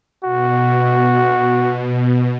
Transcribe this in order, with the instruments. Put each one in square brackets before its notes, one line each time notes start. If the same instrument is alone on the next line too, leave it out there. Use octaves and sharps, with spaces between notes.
[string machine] B2 [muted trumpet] F#4